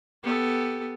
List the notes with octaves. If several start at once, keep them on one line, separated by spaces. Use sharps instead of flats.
B3 G4 A4